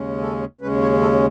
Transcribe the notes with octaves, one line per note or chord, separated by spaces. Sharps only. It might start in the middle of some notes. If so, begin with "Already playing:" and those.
Already playing: D#2 C#3 G#3 C#4
A4
D#2 C#3 G#3 C#4 B4
C#5
A4